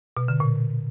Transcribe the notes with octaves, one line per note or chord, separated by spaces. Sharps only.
B2
D3
A#2